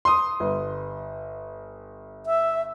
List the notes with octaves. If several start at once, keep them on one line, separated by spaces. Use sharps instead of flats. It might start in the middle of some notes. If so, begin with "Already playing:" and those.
C6 D#6
G1
E5